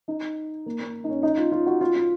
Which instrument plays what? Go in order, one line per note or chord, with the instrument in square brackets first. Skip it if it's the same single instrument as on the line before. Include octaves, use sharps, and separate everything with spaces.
[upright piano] D#4
A#3
A#3
D#4
C#4
D#4
F4
F4
F#4
F4
F4